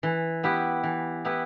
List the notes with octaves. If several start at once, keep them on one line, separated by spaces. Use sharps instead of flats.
E3
B3 E4 G4 B4
E3
B3 E4 G4 B4